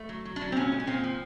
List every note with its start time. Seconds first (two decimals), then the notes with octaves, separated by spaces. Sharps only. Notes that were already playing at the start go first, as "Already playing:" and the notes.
Already playing: A3
0.09 F#3
0.25 F#3
0.36 D4
0.41 F#3
0.52 C4
0.56 A#2 C#4
0.72 G#3
0.80 C#4
0.87 A#2 C4
1.04 F3